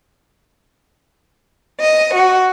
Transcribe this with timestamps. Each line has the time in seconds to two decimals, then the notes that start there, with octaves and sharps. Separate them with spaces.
1.80 D#5
2.14 F#4